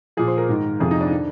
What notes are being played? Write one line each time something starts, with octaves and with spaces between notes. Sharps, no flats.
A#2 F3 G#4
C5
A#4
G#2 D#3
F2 C3 F3 G#4
D#4
D4
D#3